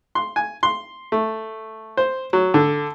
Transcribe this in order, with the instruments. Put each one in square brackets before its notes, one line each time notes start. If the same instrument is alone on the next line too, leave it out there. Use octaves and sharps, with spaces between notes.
[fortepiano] C6
G#5
C6
A3
C5
F#3
D3